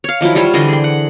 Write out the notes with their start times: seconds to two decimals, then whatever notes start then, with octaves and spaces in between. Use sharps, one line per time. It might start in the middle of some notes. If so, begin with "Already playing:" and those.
0.04 C#5 F5
0.21 D#3 F3 F#3 E4
0.35 G3 F4 C5 C#5
0.54 D3 E3 D#5 C6
0.68 G#4 G5
0.84 F#5